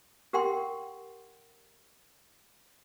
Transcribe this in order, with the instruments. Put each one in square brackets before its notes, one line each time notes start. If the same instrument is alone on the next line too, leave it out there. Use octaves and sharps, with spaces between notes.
[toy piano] G4 A#4 F#5 G5 C6